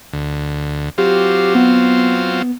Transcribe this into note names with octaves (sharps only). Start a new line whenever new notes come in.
D2
F#3 C4 F4 G4
B3